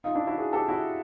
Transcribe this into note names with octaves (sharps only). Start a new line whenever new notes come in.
D#4 F4
D4 E4
E4 F#4
F#4 G#4
G4 A4
E4 F#4